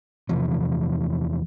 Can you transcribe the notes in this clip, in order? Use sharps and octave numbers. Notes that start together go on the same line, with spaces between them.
E2 C3 E3 F3